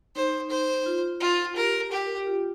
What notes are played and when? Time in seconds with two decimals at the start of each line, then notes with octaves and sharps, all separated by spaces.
0.16 D#4 C5
0.51 C5
0.86 F4
1.21 F4
1.56 G4 A#4
1.92 G4
2.06 A#4
2.16 G4
2.27 F4